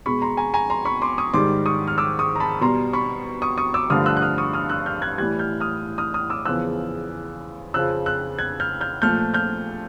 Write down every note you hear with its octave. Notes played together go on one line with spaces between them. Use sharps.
B2 G#3 B5 C#6
A#5 C6
G#5 A#5
G#5 A#5
A#5 C6
B5 C#6
C6 D6
C#6 D#6
G#2 D#3 G3 C6 D6
C#6 D#6
F6
D6 E6
C#6 D#6
A#5
A5 B5
B2 G3 A#5 C6
B5 C#6
C#6 D#6
C#6 D#6
D6 E6
G2 D3 F3 A3 D#6 F6
E6 F#6
F#6
D#6 F6
C#6 D#6
D#6 F6
E6 F#6
F6 G6
F#6 G#6
A2 E3 G3 F#6 G#6
F6 G6
D#6 F6
D#6 F6
D#6 F6
D6 E6
E2 C#3 F3 E6 F#6
F2 C#3 F3 E6 F#6
E6 F#6
F#6 G#6
F6 G6
F6 G6
A#2 F3 A3 F6 G6
F6 G6